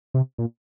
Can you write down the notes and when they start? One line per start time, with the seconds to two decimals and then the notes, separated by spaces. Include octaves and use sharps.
0.14 C3
0.38 A#2